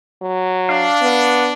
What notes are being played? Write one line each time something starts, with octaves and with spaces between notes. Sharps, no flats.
F#3
D4 F5
B3